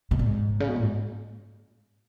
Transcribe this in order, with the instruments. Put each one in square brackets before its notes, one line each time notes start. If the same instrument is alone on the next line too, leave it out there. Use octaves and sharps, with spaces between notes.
[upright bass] B2
A#2
G#2
C#3
B2
A#2
G#2